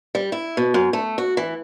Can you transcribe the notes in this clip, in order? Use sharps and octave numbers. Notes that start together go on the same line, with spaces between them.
G3
E4
B2
F#2
A3
F#4
E3